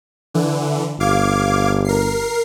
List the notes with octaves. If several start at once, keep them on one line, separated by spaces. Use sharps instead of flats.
D3 E3
G1 F5 D6 G#6
A#4 C7